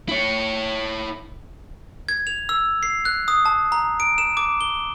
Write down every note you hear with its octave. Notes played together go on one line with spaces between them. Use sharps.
E4 C#5
G#6
F7
E6
C7
F#6
D#6
A5
A#5
D7
E7
D6
G7